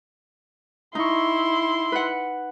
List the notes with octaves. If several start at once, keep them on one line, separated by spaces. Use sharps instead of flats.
D#4 E4 C6 C#6
B4 F#5